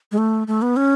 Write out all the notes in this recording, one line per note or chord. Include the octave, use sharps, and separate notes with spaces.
G#3
A3
A3
B3
C#4